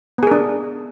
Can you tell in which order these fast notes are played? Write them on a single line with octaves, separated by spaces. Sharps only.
B3 G#4 A#4 D4